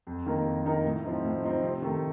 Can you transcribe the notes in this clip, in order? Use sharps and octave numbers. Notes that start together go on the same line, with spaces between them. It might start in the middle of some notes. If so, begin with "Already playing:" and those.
F2
D#3 A#3 D#4 A#4
F2
D#3 A#3 D#4 A#4
A2
F3 C4 D#4
A2
F3 C4 D#4
C3
D#3 A3